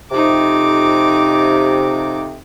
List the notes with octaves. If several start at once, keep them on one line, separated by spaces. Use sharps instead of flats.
F2 C3 D#4 D6